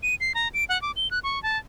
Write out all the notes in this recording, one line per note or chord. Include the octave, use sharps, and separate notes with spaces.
D#7
C7
A#5
D7
F#5
D6
G7
F#6
C#6
A5